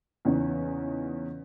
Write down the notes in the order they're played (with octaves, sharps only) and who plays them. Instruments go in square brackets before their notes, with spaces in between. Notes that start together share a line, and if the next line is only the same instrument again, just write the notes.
[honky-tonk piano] E2 C#3 C#4 D#4